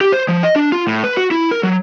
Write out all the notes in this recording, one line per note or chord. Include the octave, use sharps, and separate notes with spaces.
G4
C5
F3
D#5
D4
F4
A2
B4
F#4
E4
A#4
F#3